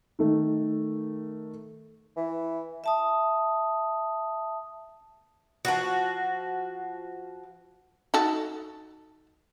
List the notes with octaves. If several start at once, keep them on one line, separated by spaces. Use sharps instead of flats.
D#3 A3
E3
E5 A5 D#6
F3 F#4
D#4 F#4 A4